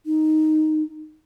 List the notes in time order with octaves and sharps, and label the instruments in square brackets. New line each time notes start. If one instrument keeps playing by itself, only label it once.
[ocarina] D#4